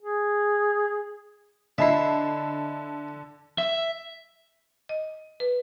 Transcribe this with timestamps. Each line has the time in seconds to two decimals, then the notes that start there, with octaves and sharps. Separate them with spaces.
0.02 G#4
1.78 D3 E4 D#5 E5 A5 B5 C7
3.58 E5
4.89 D#5
5.40 B4